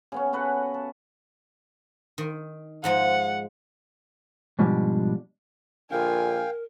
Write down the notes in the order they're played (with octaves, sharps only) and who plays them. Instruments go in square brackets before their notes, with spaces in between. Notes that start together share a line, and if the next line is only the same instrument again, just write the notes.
[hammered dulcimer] C#3 B3 C#4
F#4 A4 B4 F#5
A5
[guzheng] D#3
[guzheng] G#2 F3 G#3 [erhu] F#5
[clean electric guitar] G#2 B2 F3 G3 D4
[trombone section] A#1 D3 F4 [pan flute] A#4 [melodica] F5 G5 [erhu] G#5